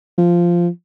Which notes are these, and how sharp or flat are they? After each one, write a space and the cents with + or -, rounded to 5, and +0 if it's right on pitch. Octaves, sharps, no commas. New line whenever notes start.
F3 -10